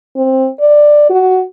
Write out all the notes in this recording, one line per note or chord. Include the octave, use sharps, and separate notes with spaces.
C4
D5
F#4